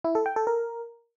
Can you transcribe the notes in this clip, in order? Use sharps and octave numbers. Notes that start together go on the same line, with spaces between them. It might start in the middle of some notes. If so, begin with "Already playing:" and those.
E4
A4
G5
A4
A#4